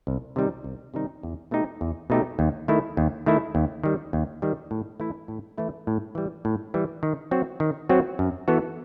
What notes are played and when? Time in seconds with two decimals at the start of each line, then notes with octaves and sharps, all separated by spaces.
0.07 C2
0.36 C3 D#3 G3 D#4
0.64 C2
0.94 C3 D#3 G3 D#4
1.23 E2
1.51 B2 A3 D#4 G4
1.81 E2
2.10 B2 A3 D#4 G4
2.39 D#2
2.68 D#3 A3 E4
2.97 D#2
3.26 D#3 A3 E4
3.55 D#2
3.83 D#3 G3
4.13 D#2
4.42 D#3 G3
4.71 A2
5.00 E3 A3 E4
5.28 A2
5.58 E3 A3 E4
5.87 A2
6.15 E3 G3
6.45 A2
6.74 E3 G3
7.03 D#3
7.31 F#3 C4 F#4
7.60 D#3
7.89 F#3 C4 F#4
8.19 F#2
8.48 E3 B3 F#4 A4